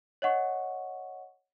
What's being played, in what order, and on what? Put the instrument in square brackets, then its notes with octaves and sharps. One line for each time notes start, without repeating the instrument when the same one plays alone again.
[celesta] C#5 D#5 F#5 C#6